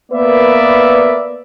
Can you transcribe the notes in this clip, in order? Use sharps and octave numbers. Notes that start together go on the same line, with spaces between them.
A#3 B3 A#4 B4 D5 E5